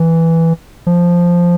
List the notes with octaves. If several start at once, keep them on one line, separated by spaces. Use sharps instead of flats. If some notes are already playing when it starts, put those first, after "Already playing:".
Already playing: E3
F3